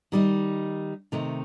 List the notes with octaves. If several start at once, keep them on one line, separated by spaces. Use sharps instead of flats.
D#3 G3 D#4
C3 D#3 A3 D#4